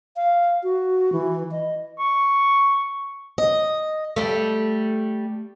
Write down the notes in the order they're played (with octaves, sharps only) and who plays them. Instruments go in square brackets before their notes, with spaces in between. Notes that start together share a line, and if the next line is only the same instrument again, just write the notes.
[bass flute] F5
F#4
E3
D#5
[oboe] C#6
[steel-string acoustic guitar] D#5
[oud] G3 A3